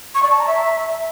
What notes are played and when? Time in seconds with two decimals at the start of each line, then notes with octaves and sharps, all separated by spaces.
0.15 C#6
0.23 D5
0.31 A5
0.39 A#5
0.47 E5